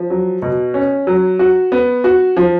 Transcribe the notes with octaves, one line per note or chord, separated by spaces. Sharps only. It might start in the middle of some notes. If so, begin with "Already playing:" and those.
Already playing: F3
F#3
B2
C#4
F#3
F#4
B3
F#4
F3